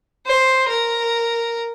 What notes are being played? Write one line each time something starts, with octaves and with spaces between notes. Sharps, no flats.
C5
A#4